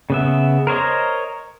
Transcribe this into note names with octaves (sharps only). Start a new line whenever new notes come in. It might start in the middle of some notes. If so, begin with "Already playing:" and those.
C#3 B3 E5
A#4 C5 C#5 D#5